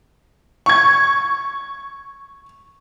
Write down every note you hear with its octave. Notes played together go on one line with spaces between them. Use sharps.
C#6 G#6